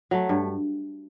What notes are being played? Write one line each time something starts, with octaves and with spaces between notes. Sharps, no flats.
F#3 A3
G2